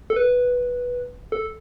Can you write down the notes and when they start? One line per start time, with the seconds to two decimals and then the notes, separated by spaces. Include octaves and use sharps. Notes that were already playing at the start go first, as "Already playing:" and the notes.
0.10 A4
0.16 B4
1.32 A4